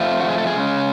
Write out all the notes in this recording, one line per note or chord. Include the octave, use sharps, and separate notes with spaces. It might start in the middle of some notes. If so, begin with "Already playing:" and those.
Already playing: F2 F3 A3 F4
F#4
G#4
A4
G#4
C#3 G#3 C#4